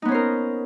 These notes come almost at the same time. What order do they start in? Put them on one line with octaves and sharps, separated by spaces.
D#4 B3 C#4 C5 A#4